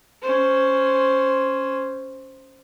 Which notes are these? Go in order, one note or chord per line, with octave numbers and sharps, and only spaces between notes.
C#4 C5